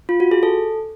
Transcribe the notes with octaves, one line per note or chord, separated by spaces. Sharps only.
F4
F#4
G#4
A4